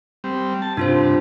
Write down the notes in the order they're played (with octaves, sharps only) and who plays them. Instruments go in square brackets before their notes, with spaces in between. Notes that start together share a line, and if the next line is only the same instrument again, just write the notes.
[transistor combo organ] G3 C4
A5
[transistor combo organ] G2 C3 [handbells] D4 F4 C5